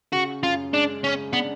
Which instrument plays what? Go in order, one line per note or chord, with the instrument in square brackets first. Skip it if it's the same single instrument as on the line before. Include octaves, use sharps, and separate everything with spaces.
[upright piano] C#3 [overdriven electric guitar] F#4
[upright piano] F#2 [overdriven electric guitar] F4
[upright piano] G#3 [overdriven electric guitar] D4
[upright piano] C#3 [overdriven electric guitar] C#4
[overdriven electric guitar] B3 [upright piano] D4